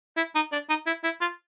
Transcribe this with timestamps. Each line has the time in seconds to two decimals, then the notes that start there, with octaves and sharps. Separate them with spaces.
0.17 E4
0.35 D#4
0.52 D4
0.70 D#4
0.87 E4
1.04 E4
1.21 F4